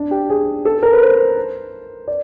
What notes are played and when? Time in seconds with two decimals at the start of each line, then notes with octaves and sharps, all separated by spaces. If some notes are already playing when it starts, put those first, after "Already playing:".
Already playing: D4
0.11 G4
0.30 G#4
0.65 A4
0.83 A#4
0.93 B4
1.01 C5
2.08 D5